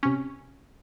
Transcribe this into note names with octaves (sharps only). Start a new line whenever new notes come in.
C3 C#4